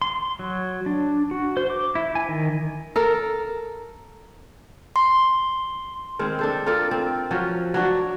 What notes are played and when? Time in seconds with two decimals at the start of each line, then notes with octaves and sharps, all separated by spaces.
0.02 C6
0.39 F#3
0.86 D4
1.31 F#4
1.57 C5
1.70 D6
1.95 E4
2.15 G#5
2.28 D#3
2.96 A4 A#4
4.96 C6
6.19 D#3 G#3 C4
6.39 D4 A4 C5
6.66 F4 A4 A#4 D5
6.91 C4
7.31 F3 F#3 C#4
7.74 F#3 D4 F#4 D5